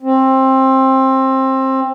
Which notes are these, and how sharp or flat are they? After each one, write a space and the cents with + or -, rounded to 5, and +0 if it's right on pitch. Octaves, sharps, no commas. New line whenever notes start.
C4 +20